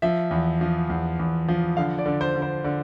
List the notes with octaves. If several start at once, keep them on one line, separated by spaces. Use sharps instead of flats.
F3 E5
E2
F3
E2
E2
F3
D3 F5
D5
D3
C5
D3
C5
D3